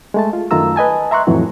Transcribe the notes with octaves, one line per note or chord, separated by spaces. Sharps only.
G#3 A3 A5
F4
F#2 D#3 A3 F4 A#5 E6
B4 D#5 G#5 A5
E5 A#5 C6 C#6 F#6
F2 A2 E3 F#3